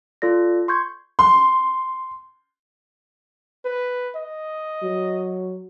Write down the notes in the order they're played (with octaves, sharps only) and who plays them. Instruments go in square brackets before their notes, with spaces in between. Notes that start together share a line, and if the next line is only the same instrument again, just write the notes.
[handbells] F4 A4 D5 A#6
C6 C#6 G6 G#6
[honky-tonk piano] C6
[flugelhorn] B4
D#5
[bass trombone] F#3